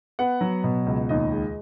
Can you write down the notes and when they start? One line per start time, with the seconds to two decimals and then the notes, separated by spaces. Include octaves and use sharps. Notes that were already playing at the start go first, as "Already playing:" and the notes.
0.19 B3 F#5
0.41 F#3
0.64 B2
0.86 C#2
1.09 D#2 D#5
1.32 G#3